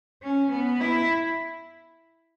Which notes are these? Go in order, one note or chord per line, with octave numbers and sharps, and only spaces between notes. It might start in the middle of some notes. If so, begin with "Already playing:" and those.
C#4
B3
E4